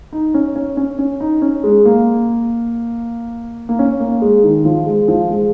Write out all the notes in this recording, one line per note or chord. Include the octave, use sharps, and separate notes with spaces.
D#4
C#4
C#4
C#4
C#4
D#4
C#4
G#3
A#3
A#3
C#4
A#3
G#3
D#3
F3
G#3
F3
G#3